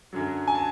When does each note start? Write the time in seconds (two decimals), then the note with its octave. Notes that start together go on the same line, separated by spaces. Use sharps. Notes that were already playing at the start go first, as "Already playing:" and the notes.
0.13 F#2 D3 F#3
0.48 G#5
0.55 A5